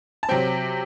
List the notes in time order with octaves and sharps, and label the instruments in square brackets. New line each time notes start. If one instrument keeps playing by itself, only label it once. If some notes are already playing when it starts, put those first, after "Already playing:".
[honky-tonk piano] A5
C3 F#3 C4 G5